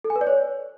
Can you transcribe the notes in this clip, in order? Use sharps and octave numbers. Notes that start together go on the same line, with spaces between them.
A4
G#5
B4
D5
C#5